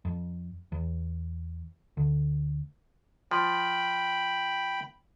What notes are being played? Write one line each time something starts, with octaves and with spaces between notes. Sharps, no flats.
F2
E2
D2
F3 G5 B5